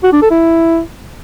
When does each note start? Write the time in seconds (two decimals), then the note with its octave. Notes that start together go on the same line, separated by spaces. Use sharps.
0.04 F#4
0.13 D4
0.22 A4
0.31 E4